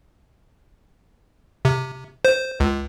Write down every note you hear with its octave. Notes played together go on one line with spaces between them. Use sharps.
C3
C5
C#2